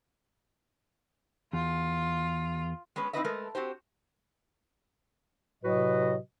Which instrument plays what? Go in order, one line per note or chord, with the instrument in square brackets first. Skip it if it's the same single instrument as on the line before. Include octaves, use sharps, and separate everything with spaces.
[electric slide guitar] E2 [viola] F4
[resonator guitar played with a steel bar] G#3 B3 C#4 B4
C4 D#4 E4 B4 D#5 E5
G#3 A3 A#4 B4
C4 F#4 G4 C5
[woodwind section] A2 C3 F#3 F#4 B4 D#5